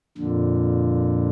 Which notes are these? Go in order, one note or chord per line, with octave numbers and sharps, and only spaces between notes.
F2 A#2 D3